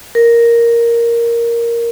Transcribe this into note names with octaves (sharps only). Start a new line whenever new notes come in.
A#4